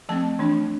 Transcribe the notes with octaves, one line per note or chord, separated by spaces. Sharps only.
F3 A3 C4 A5
E3 A3 D4